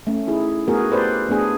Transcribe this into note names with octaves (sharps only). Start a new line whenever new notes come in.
A3 C#4
D#4 E4 G#4
A3 B3 F#4 G#4 A#4
G4 A4 B4 C5 D5
A3 B3 D4 G#4